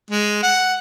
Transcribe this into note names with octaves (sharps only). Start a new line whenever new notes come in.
G#3
F#5